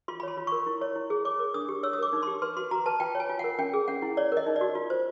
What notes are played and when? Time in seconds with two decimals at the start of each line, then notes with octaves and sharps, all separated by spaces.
0.08 F4 C6
0.20 B5
0.23 C#5 C6
0.37 F4
0.47 A#4 C#6
0.67 E4
0.81 C#5
0.96 E4
1.10 G#4
1.25 C#5 D6
1.39 A#4
1.54 D4 D#6
1.69 G4
1.83 C#5 E6
1.93 D#6
1.99 A#4 D6
2.13 D#4
2.23 G4 C6
2.42 B4 C6
2.56 F#4 C6
2.71 F#4 A#5
2.86 B4 A5
3.00 F4 G5
3.15 C#5
3.20 G#5
3.29 F4
3.39 A#4 F#5
3.59 C#4 G5
3.73 G#4
3.88 C#4 F#5
4.02 E4
4.17 C#5 D5
4.32 A#4 D#5
4.46 D#4
4.56 D5
4.61 F#4
4.75 F4
4.90 C5